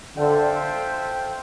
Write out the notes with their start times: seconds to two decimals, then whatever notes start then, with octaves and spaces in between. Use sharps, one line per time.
0.17 D3 F4 A4 C5 E5 G5